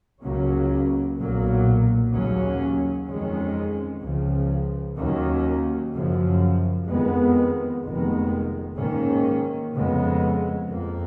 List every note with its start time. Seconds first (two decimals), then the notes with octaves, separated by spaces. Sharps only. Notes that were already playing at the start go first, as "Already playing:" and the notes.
0.22 C#2 C#3 F#3 A#3 C#4
1.17 B1 A#2 F#3 A#3
2.13 D#2 C#3 F#3 C#4
3.08 F2 D#3 G#3 C#4
4.02 C#2 C#3 F3
4.97 D#2 D#3 F#3 A#3 C#4
5.93 F#2 C#3 F3
6.88 F2 D#3 G#3 B3
7.82 F1 F2 D#3 G#3 B3
8.77 G#2 D#3 A#3 C#4
9.72 F2 C#3 G#3 B3
10.67 F2 F3 A#3